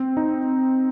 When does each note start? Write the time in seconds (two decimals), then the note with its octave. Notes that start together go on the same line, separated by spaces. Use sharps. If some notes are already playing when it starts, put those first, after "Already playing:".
Already playing: C4
0.17 D#4